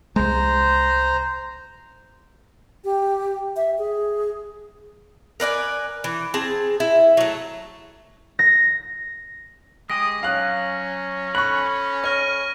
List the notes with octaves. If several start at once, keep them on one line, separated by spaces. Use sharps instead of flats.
C2 G#3 C5 A#5
G4
E5
G#4
A#4 B4 D5 G#5
E3
C4 G#4 A5
E4
F#3 A3
A#6
G#3 G4 G#4 D#6 A#6
F#3 C#4 F5 F#6
F#4 A4 B5 C#6 F#6
C#5 C#6 F6 A#6